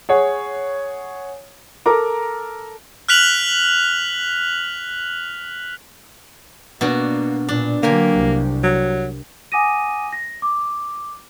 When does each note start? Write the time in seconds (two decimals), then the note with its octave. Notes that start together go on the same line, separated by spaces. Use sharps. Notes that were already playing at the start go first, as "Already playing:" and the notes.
0.09 G#4 C#5 F#5
1.86 A4 A#4 A#5 D6
3.09 F6 F#6 B6 F7 F#7
6.81 B2 A#3 D4 F#4
7.49 A#2 D4
7.83 D3 F#3 A#3 G4 A#4 G#5
8.16 C2
8.64 F#3
9.52 F#5 G#5 D6 D#6 A#6 D#7
10.12 A#6
10.42 D6